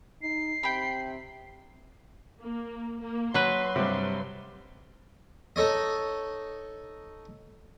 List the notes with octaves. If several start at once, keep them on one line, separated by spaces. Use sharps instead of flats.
D#4 C7
C3 G5 B5
A#3
A#3
F#3 B4 C6
G2 C3
D#4 A4 C#5 D#5